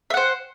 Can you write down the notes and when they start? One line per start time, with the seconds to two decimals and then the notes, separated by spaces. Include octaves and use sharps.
0.10 E5
0.14 F#5
0.17 C5